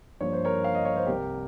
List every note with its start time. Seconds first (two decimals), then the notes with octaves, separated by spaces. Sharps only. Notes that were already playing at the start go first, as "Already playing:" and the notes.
0.21 G2 F3 A#3 C#5
0.32 C5
0.45 A#4 C#5
0.64 F5
0.75 D#5
0.85 C#5
0.96 C5
1.06 C2 C3 G3 G4 A#4